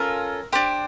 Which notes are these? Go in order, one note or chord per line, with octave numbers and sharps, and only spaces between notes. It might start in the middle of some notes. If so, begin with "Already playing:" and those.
Already playing: C#4 F4 A4 A#4
D4 G4 C5